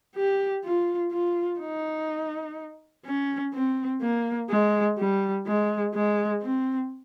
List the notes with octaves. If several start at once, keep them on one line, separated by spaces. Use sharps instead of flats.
G4
F4
F4
D#4
C#4
C4
A#3
G#3
G3
G#3
G#3
C4